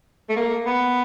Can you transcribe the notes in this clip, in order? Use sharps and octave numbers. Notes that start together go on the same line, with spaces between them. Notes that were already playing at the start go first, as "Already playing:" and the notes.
A3
A#3
B3